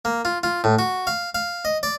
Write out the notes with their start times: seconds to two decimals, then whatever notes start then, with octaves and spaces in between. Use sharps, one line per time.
0.05 A#3
0.25 F4
0.43 F4
0.64 A2
0.79 F#4
1.07 F5
1.35 F5
1.65 D#5
1.83 D5